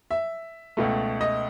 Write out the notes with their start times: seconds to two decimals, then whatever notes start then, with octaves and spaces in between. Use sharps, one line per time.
0.11 E5
0.77 C#2 B2 A3
1.21 D#5